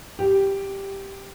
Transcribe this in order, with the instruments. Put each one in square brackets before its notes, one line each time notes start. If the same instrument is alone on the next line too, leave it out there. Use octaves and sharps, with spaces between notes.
[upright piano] G4